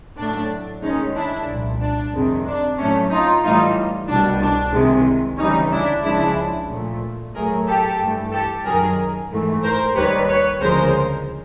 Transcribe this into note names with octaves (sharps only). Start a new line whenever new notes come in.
A2 F#3 A3 D4
D#2 D#3 G#3 C#4 D#4
D4 E4
C2 A#2 F3
D4
F2 C3 D#3 G#3
D4
A2 F#3 A3 C#4
D#4 F4
A2 E3 G3 D#4 F4
C2 B2 G3 D4
D4
C2 C3 D#3 G#3
D2 C#3 E3 G3 C#4 D#4
D4 E4
C#2 C#3 F3 G#3 D4 E4
A#2 F3 A3
A2 F#3 A3 G#4 A#4
G4 A4
G2 E3 A3
G4 A4
F#2 D#3 F#3 G#4 A#4
G#2 E3 A3
A#4 C5
D#2 D#3 G3 B4 C#5
B4 C#5
D2 C#3 F3 G#3 A#4 C5